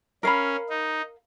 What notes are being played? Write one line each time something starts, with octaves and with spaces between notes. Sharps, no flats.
C#4 A#4 F5 B5
D#4